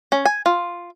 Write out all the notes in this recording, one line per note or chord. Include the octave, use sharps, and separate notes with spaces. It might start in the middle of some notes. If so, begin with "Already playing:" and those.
C#4
G#5
F4